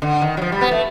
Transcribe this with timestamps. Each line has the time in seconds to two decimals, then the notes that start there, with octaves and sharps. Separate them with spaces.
0.02 D3
0.22 D#3
0.37 F#3
0.42 F3
0.52 G3
0.61 B3
0.71 A3